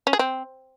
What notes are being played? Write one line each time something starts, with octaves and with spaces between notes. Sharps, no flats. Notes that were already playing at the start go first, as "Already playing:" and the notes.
C#4
G#4
C4